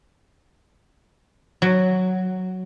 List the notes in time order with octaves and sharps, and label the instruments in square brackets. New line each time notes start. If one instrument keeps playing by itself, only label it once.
[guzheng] F#3